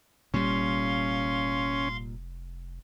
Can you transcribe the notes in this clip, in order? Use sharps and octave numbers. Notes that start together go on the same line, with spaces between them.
F1 A#2 G3 C#4 F5 C6